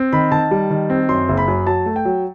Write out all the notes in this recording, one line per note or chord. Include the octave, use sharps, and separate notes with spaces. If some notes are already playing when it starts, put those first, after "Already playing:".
Already playing: C4
D#3 B5
D#3 A5
G3
D#3
C4
F#2 C6
F#1
B5
F#2
F#3 A5
A3
G5
F#3